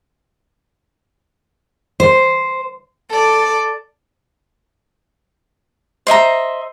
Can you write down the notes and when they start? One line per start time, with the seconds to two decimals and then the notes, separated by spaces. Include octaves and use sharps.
2.00 C5
3.09 A4 D5
6.07 C5 D#5 E5 A#5